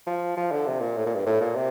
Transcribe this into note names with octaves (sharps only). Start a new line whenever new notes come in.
F3
F3
D3
C3
A#2
A2
A#2
G2
A2
A#2
C3